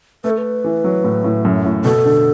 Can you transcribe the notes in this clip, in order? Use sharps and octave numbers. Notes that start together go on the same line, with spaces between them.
A3 B4
A4
B4
E3
F#3
A2
A2
F#2
A2
B2 A4
D3